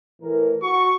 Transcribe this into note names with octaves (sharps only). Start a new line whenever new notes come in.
A2 E3 A#4
F#4 C#6